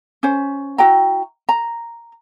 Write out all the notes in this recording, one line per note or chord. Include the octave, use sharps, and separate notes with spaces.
C#4 C5
E4 F#4 G5 A#5
A#5